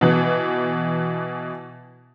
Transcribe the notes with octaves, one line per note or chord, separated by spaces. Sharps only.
B2 E3